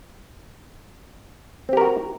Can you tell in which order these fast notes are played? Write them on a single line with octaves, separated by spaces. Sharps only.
C4 G4 A#4 F#4